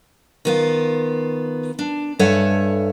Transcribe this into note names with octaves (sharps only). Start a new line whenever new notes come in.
D#3 B3 F4
D4
G2 A4 C#5 E5 F#5 G#5